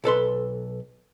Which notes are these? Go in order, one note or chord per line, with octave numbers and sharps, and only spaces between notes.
B1 A4 B4 C6